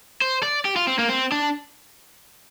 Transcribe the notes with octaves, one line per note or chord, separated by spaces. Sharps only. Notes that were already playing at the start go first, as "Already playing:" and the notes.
C5
D5
G4
F4
C4
A#3
C4
D4